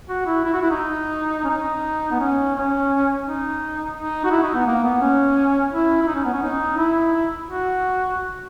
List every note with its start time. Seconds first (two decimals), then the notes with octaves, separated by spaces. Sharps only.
0.09 F#4
0.26 E4
0.44 E4
0.53 F#4
0.62 E4
0.71 D#4
1.44 C#4
1.50 D#4
2.11 B3
2.20 C#4
2.55 C#4
3.26 D#4
3.96 D#4
4.24 F#4
4.31 E4
4.43 D#4
4.54 B3
4.66 A#3
4.84 B3
5.01 C#4
5.71 E4
6.02 E4
6.07 D#4
6.15 C#4
6.25 B3
6.33 C#4
6.42 D#4
6.77 E4
7.47 F#4